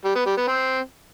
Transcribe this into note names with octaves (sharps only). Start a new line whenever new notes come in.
G3
B3
G3
B3
C4